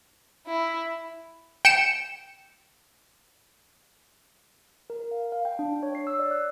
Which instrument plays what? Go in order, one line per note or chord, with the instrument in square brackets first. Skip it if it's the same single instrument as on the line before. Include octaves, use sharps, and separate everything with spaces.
[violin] E4
[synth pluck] G5 C#7 E7
[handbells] A#4
F5
F5
G5
D4
C#5
C7
E6
D5
F#6